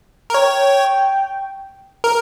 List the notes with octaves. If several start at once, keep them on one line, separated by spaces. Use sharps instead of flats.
A#4
C#5 G5
A#4